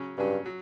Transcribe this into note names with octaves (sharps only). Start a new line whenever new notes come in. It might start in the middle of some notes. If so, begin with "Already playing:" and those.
Already playing: C#3 F#3 C#4
G2 C#3 F#3 C#4
F#3